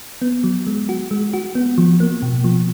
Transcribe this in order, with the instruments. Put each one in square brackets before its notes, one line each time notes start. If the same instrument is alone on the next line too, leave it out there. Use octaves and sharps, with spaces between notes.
[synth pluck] B3
F#3
G#3
F#4
G#3
F#4
B3
F3
A#3
B2
F3